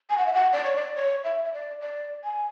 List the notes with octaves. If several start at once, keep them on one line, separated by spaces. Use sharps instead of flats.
G#5
F#5
E5
F#5
D5
C#5
D5
C#5
E5
E5
D5
D5
G#5